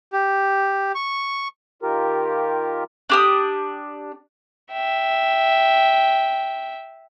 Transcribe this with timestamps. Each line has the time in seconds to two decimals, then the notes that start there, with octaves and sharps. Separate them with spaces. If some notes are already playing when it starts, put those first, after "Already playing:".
0.13 G4
0.95 C#6
1.82 D#3 F4 G4 A#4
3.10 D4 G4 D#6
4.72 E5 G5